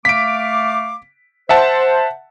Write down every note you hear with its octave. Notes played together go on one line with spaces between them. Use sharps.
A3 F5 D6 B6 D7
C5 E5 F#5 A5